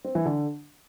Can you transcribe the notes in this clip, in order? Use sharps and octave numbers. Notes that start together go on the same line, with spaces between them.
C4
E3
D3